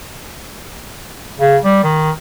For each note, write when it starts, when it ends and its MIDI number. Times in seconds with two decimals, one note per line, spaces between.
1.39 1.57 49
1.64 1.83 55
1.84 2.11 51